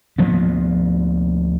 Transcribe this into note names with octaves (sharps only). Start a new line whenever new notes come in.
D2 F3 A#3 B3